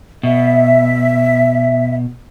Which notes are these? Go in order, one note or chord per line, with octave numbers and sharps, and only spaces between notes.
B2 E5